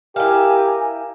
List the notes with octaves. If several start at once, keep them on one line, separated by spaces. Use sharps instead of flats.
E4 G4 A#4 F5 G#5